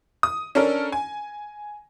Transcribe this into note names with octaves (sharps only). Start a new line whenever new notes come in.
D#6
C#4 D4 A4 A#4
G#5